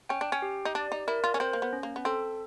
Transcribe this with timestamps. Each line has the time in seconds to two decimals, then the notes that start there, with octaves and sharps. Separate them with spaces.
0.09 C#4 G5
0.21 D4
0.32 C#4
0.42 G4
0.65 D#4
0.75 D4 D5
0.92 D#4
1.08 E4 A#4
1.24 F4
1.34 C#4
1.40 C4 C5
1.53 A#3
1.62 B3
1.73 C#4
1.83 A#3
1.96 B3
2.05 C4 A4